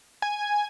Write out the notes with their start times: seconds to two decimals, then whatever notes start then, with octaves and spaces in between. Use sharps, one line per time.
0.22 G#5